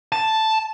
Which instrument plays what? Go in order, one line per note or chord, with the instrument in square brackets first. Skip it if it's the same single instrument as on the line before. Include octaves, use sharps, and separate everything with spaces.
[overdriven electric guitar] A5